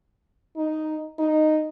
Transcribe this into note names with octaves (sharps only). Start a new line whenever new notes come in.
D#4
D#4